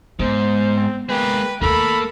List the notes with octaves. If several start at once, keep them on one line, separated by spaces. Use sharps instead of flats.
G#2 B3 C5
C4
G#3 A#3 B4 G5
D#2 A3 A#3 A4 B5